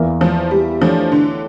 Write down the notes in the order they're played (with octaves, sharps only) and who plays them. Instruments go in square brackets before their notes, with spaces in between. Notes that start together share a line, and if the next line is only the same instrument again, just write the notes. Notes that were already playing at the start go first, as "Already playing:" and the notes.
Already playing: [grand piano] E2 E3 A#3 E4 A#4
[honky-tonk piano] F3
G3
[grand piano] E3 A3 D4 G4 C#5 [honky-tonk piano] F3
[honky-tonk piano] D3